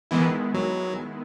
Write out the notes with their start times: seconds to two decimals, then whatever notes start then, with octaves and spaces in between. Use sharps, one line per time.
0.11 D#3 E3 G#3 B3 E4
0.54 F#3